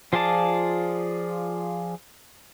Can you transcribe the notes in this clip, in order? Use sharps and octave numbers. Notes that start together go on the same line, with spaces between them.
F3 F4 G#4 D5 A5